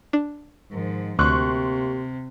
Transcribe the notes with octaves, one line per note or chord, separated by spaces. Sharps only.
D4
G#2 D#3 F3
D2 C3 A#3 G4 C6 C#6 F#6